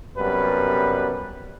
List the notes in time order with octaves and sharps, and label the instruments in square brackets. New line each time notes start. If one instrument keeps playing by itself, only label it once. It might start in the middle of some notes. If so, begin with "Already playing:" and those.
[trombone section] F#2 C3 G3 B3 B4